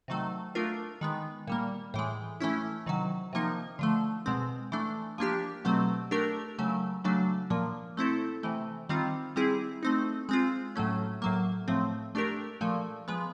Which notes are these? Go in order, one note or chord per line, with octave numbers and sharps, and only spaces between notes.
C3 D#3 F#3 A3
A3 D4 F4 A#4
D#3 G#3 B3
A#2 G3 A#3
A2 E3 G#3
E3 A3 C#4 E4
C3 D#3 F#3
C3 F3 A#3 D#4
D3 F3 A3
B2 G#3 C4
E3 A3 D4
F3 A#3 D4 G4
B2 F#3 A3 C4
A3 D4 G4 A#4
C#3 F#3 A3
C#3 F#3 A3 D4
A#2 F3 A#3
A3 C4 E4 A4
C3 E3 A3
D#3 G3 C4 F4
G3 C4 E4 G#4
A3 C4 D#4
G#3 C4 F4
A2 F#3 A3 C#4
A2 F#3 A#3
A2 F3 A3 C4
A3 D4 G4 A#4
A#2 F3 A3
F3 G#3 B3